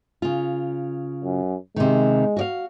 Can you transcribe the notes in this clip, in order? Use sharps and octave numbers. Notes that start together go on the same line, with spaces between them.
C#3 F4
F#2
C3 D#3 G#3
F#4 D5 F5